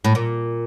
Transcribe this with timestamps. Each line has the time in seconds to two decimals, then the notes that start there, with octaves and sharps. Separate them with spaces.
0.04 A2
0.15 A#2